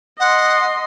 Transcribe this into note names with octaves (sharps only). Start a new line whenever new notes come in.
D#5 F#5 C6